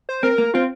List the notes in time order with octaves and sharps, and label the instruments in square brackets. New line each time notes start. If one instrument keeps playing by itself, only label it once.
[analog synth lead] C5
[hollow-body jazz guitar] C4 [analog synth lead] A#4
[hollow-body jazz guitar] A#3
[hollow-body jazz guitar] C4 [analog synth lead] F4